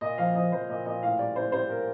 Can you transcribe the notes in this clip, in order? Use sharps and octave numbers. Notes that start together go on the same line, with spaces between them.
A#2 D#5
F3 F5
F3 D#5
F3 C5
A#2 D#5
A#2 D#5
A2 F5
G3 D5
A2 C5
G3 C5
G3 A#4